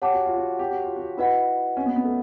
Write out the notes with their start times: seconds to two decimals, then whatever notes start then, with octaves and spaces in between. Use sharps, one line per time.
0.02 G4 C#5 F#5 A5 D6
0.13 F#4
0.25 F4
0.36 F#4
0.59 G4
0.71 F#4
0.83 F4
0.96 F#4
1.17 E4 F#4 B4 D#5 F#5
1.77 C#4
1.86 B3
1.96 B3
2.05 A3